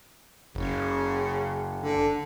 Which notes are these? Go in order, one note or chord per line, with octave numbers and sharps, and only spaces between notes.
F#1 C#3
D3